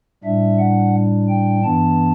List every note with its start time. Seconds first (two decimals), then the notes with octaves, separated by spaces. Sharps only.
0.24 A2 G3 D4 E5
0.59 F#5
1.29 G5
1.64 G2 E3 B3 D4 A5